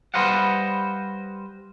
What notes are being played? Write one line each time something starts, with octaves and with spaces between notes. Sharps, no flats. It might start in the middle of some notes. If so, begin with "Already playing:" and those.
G3 B4 C5 D#5 F5 F#5